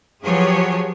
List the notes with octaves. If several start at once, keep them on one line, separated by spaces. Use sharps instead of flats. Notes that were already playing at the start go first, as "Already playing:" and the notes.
F3 F#3 G4 G#4 B4 C#5